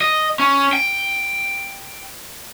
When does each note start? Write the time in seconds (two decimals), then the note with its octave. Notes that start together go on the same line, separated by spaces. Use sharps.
0.01 D#5
0.39 C#4
0.73 G5